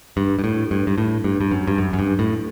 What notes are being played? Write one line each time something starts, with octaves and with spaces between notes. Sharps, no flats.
G2
G2
A2
G2
G2
A2
G2
G2
F#2
G2
F#2
F#2
G2
A2